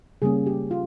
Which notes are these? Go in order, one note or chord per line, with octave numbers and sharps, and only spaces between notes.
C#3 G3 A#3 C#4 G#4
G4
F4